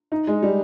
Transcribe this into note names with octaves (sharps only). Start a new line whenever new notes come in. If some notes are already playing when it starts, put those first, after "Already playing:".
D#4
G#3
G3